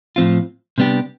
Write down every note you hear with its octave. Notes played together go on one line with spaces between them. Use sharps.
A2 F3 C4 F4
C3 G3 B3 D4 G4